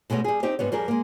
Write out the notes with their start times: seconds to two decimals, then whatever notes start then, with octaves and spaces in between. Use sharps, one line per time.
0.10 B2 G#3 A3 B3 C#4
0.24 G3 G#4
0.43 C4 D#4 G4
0.59 G#2 G3 B3 C#5
0.72 F2 G3 G#4 A#4
0.88 G#3 A#3